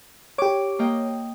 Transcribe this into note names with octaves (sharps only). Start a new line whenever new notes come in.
G4 C#5 D6
A#3 D#5 G5